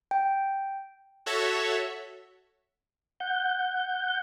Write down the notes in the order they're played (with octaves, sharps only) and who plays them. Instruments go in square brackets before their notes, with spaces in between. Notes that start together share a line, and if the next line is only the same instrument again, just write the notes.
[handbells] G5
[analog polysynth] F#4 A4 C#5 E5
[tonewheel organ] F#5 G6